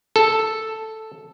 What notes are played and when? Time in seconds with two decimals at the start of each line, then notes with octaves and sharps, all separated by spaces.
0.16 A4